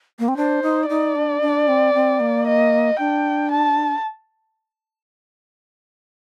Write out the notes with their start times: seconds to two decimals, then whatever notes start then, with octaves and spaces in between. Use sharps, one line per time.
0.19 A#3
0.28 C4
0.37 D4 C5
0.62 D#4
0.89 D#4 D5
1.15 D4
1.41 D4
1.68 C4
1.94 C4
2.20 A#3
2.47 D#5
2.99 D4 G5
3.51 A5